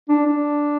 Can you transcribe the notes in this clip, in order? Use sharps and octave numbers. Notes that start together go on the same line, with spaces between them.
D4
D4